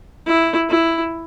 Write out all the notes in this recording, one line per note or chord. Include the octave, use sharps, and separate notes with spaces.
E4
E4